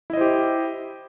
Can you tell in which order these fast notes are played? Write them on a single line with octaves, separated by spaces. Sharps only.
E4 D#5 C5 G4